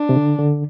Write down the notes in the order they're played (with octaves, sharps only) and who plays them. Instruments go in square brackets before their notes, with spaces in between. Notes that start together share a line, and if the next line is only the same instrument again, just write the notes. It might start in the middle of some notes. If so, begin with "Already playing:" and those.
Already playing: [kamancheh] D4
[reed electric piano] C3
D3
D3